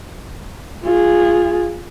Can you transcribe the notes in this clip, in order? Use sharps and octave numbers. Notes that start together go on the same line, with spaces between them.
F4 G#4